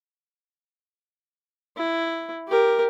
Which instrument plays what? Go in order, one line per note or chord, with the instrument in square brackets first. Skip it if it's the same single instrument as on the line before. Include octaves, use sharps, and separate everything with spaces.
[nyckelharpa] E4
G4 A#4